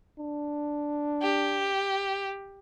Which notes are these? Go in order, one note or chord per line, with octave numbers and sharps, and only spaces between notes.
D4
G4